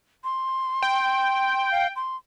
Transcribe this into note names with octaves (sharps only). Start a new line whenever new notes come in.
C6
G5
F5
C6